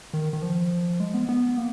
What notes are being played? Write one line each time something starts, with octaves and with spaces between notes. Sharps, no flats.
D#3
D#3
F3
G#3
B3
B3
A#3